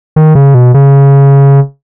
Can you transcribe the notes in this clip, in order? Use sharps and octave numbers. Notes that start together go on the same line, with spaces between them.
D#3
C#3
B2
C#3